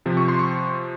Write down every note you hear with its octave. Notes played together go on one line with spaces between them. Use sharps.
C3 F3
C#6
C6
C#6